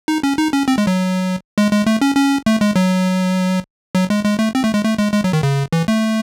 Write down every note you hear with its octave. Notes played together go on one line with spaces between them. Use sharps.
D#4
C#4
D#4
C#4
C4
G#3
F#3
G#3
G#3
A3
C#4
C#4
A3
G#3
F#3
F#3
G#3
G#3
A3
C4
A3
G#3
A3
G#3
G#3
F#3
D#3
C#3
E3
A3